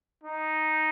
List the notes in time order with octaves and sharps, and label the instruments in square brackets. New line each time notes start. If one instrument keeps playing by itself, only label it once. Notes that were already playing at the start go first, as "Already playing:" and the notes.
[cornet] D#4